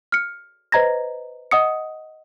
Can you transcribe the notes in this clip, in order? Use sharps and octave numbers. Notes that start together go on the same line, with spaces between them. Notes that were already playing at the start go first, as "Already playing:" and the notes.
F6 C#7
B4 C5 D#5 A#5 G#6 A#6
D#5 F#5 D#6 C#7